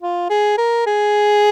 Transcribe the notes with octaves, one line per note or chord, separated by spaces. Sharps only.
F4
G#4
A#4
G#4